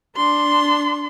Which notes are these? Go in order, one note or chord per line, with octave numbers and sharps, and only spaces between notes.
D4 C6